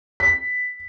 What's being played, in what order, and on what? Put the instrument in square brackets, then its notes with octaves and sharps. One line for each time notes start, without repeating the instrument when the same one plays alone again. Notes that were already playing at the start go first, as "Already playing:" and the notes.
[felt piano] B6